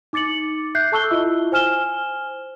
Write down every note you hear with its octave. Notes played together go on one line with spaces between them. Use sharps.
D#4 D6 A6 C#7 F#7
E5 D6 F#6 G6 C7
A4 A5 C#6 E6 F#6 G7
E4 F4 D#5 E5
C5 G#5 F6 E7 G7